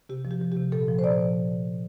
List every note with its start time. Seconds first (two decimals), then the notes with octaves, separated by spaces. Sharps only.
0.09 C3 G4
0.25 F3
0.31 G4
0.41 F3
0.52 G4
0.57 C3
0.72 A#2 A4
0.88 F3
0.99 C5
1.04 A#2 D5
1.19 F3